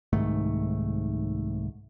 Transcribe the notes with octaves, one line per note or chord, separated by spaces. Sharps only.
C2 G#2 D#3 A3